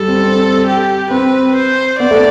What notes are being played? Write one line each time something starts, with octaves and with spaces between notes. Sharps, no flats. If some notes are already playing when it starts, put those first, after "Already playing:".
Already playing: G3 A4
C4
C4
G4
C4 B4
C5
B3 D5
A3